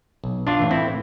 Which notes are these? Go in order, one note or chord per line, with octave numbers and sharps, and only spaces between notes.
B1
D4 F4
A2 E3
C4 E4